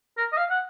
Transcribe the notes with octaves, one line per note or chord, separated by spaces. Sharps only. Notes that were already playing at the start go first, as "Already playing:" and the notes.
A#4
D#5
F5
F#5